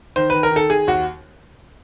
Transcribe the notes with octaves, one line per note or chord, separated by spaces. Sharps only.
D#3 C5
D#3 B4
A#4
D#3 A4
D#3 G#4
D#2 F#4